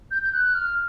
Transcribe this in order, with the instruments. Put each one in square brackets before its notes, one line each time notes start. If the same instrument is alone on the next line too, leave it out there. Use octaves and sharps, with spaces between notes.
[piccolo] G6
G6
F#6
F6